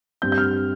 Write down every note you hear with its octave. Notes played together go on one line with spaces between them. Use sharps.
G2 G3 C4 G6
G6
F6